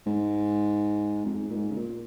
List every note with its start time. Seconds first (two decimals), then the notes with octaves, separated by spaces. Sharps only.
0.07 G#2
1.26 F2
1.34 G#2
1.50 A#2
1.56 G#2
1.71 C#3
1.76 A#2